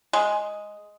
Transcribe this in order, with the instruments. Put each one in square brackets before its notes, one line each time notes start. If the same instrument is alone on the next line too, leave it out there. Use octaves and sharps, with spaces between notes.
[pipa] G#3